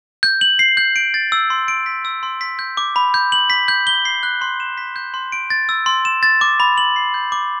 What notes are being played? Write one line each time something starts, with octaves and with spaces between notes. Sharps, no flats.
G6
F#7
C7
G6
D7
A6
E6
C6
D7
B6
E6
C6
B6
G6
D6
B5
G6
F#7
B6
G6
G7
C7
F#6
C6
E7
B6
G6
C6
D7
A6
E6
C6
E7
A6
D6
B5
F#7
C7
G6
D6